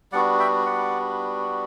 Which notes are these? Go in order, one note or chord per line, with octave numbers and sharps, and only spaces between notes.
G3 B3 D4 F#4 D5 F#5
E5 G5
D5 F#5